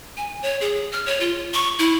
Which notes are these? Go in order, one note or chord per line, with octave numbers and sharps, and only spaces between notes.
G#5
C#5
G#4
F6
C#5
F4
C#6
E4